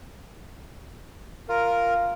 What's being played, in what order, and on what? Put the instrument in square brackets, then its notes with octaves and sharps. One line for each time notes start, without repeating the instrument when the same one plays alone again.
[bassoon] F4 [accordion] A#4